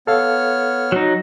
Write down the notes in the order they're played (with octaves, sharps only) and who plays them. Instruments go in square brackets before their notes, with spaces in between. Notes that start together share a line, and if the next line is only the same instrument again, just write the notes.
[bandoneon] B3 C#5 F6 [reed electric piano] A4 F5
[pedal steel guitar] F#3 D#4